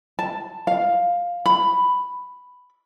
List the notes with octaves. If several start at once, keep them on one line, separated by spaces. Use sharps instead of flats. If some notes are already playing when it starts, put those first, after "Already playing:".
A5
F5
B5